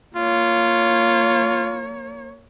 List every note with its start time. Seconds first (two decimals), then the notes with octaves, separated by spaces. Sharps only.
0.16 A#3 F4 C#5